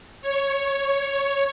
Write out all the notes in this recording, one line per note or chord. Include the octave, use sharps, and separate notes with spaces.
C#5